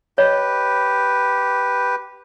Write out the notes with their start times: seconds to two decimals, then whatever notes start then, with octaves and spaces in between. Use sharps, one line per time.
0.18 G4 B4 C#5 D#5